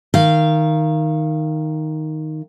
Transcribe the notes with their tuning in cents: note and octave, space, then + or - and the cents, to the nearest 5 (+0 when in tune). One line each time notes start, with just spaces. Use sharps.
D#3 +0 F5 -25